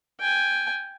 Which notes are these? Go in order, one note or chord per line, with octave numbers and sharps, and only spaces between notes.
G5 G#5